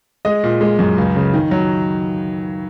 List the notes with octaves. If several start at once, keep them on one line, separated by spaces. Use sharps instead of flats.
G#3 D#5
A#2
G#3
F#2
C#2
C#3
D#3
F#3